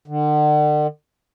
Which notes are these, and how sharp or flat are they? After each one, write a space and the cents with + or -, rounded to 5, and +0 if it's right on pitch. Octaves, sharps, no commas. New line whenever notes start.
D3 +40